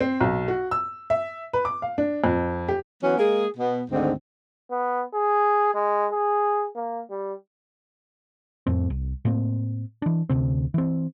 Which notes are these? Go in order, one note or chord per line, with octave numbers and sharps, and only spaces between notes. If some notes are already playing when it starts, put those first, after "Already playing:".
C4
B1
F#4
E6
E5
B4
D6
F5
D4
F2
G4
E3 F#3 B3 C#4
G#3 A#3 G#4
B2 B3
D2 G#2 D3 D#3 C4
B3
G#4
G#3
G#4
A#3
G3
F2 A2 C4
C2
A2 A#3 C4
E3 D4
D2 C3 C4
E3 C4